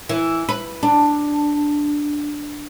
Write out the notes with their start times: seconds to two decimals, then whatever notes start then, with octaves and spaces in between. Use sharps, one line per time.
0.09 E3
0.49 B4
0.83 D4